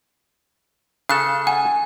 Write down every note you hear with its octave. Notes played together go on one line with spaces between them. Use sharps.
C#3 A4 F5 F#6
F#5 G#5